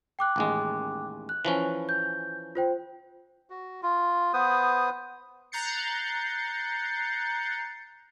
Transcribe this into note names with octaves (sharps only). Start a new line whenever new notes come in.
G5 D6 F#6
A1 D#2 G#3
F#6
E3 F3 C#4
G6
F4 C5 G5
F#4
F4
B3 B4 C5 D#6
A#5 F#6 G6 A6 C7 C#7